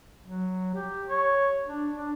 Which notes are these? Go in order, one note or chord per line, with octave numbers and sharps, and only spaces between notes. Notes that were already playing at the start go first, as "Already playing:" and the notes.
F#3
G4
C#5
D4
D4